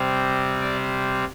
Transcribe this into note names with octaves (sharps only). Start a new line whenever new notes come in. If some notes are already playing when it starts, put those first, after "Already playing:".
Already playing: C3 G3 C4
D5